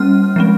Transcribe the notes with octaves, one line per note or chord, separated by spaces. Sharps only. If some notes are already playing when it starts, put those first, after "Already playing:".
Already playing: G3 A#3 C#4 F6
F3 G#3 C4